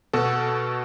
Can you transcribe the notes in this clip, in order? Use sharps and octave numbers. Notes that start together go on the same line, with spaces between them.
B2 F#4 A4